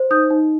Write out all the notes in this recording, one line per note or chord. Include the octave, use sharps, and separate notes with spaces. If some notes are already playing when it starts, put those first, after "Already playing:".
Already playing: C5
D#4 D#6 G6
D#4